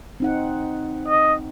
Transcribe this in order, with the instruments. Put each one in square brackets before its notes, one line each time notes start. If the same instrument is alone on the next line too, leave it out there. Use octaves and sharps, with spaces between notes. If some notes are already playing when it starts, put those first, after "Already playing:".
[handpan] C4 D#4 F#5
[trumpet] D#5